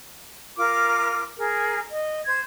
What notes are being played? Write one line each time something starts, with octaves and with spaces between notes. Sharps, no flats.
F4 A#4 D6
G#4 A#4
D#5
C5 G#6